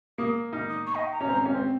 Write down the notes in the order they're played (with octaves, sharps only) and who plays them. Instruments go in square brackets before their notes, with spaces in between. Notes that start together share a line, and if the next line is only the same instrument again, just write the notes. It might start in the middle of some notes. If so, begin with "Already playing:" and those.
[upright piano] A#3 [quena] D#6
[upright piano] D#4 [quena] F6
[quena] D#6
C#6
D#5
G5
A#5
[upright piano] C#4
C4
C#4
C4